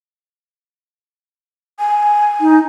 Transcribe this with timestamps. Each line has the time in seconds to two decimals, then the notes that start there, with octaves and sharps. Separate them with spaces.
1.79 G#5
2.41 D#4